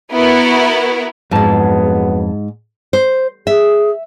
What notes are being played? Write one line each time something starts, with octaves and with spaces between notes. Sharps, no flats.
B3 E4 F#4 A#4
A#1 F2 G#2 F#3 G#3 B3 A5
C5
G#4 E5